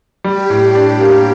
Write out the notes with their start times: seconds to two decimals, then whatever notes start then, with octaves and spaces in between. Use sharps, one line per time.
0.24 G3 G4
0.50 A2
0.75 D4
1.01 A#3